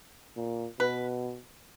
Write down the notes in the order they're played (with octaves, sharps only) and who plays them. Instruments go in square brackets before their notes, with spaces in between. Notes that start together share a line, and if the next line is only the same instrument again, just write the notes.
[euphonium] A#2
[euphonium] B2 [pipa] B4